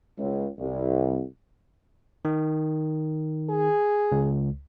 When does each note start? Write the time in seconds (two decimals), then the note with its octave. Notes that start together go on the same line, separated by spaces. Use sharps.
0.18 C#2
0.59 C2
2.25 D#3
3.50 G#4
4.12 C#2